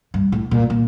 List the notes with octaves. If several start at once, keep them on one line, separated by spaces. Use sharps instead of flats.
G2
A2
A#2
A#2